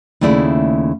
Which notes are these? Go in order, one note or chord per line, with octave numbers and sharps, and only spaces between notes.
D#2 C#3 A3 E4 D5